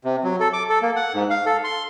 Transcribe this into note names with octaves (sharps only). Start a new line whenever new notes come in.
C3
F#3
A4
D6
A4
A#3
F#5
G#2
F5
A4
C6